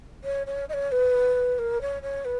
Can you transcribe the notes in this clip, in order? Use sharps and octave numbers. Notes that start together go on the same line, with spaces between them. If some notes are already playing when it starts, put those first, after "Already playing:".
C#5
C#5
D#5
C#5
B4
A#4
C#5
C#5
B4